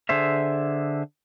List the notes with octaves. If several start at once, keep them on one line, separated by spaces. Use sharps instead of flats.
D3 G#4 C5 E5